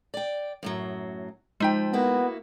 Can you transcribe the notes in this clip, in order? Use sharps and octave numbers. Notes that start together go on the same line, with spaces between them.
D5 G5
F#2 A2 F#3
F3 G#3 D#4 G5
A#3 B3 E4 F#4